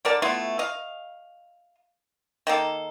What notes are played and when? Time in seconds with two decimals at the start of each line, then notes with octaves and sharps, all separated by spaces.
0.05 D3 A#4 D5 A5
0.22 A3 B3 E4 F4
0.59 D#5 F5
2.47 D#3 A#3 A4